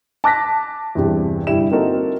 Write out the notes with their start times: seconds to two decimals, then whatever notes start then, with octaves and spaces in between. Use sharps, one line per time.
0.24 A5 D6 F#6 A#6 B6
0.95 E2 G2 C3
1.47 G1 G3 E4 E7
1.71 A#3 C4 D#4 F#4 A4 A#4